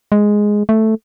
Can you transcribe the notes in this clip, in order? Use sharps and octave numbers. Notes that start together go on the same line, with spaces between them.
G#3
A3